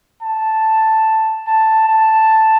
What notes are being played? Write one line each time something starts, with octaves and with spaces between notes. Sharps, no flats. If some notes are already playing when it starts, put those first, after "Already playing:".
A5
A5
A5